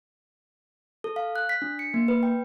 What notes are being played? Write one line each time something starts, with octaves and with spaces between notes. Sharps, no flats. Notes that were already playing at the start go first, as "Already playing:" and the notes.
A4
F5
F#6
B6
D4
C#7
A#3
B4
G5